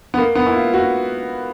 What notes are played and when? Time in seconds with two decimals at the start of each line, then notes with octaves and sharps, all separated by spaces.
0.14 B3
0.18 A#3
0.35 B3
0.47 E4
0.55 F4
0.74 F#4